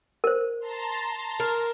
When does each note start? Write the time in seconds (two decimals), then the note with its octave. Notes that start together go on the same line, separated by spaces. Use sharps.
0.24 A#4 C5
0.60 A5 A#5 C6
1.40 A#4